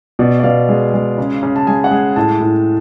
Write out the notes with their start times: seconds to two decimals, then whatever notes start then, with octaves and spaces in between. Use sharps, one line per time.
0.19 B2 D5
0.40 D5
0.43 B2 F5
0.69 G#3
0.94 G#3
1.18 C#3
1.43 C#3
1.56 A5
1.67 G#3 G#5
1.84 F#5
1.91 G#3 G#5
2.16 A2 A5
2.40 A2